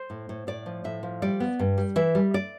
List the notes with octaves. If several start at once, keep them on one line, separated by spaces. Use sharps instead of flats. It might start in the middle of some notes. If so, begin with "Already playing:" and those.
Already playing: C5
A2
A2
A2 D5
F3
A2 E5
F3
G3 D5
B3
G2
G3
E3 E5
G3
D5